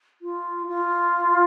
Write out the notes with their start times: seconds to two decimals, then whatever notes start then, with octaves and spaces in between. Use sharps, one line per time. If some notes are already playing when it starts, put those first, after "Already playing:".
0.22 F4
0.67 F4